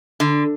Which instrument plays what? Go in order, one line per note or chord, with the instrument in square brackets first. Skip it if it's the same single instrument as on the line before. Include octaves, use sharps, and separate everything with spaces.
[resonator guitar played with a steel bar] D3